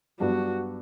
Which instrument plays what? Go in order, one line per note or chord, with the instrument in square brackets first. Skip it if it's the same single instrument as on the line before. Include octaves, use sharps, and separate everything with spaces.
[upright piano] G2 F#3 B3 D4 [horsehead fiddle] F#4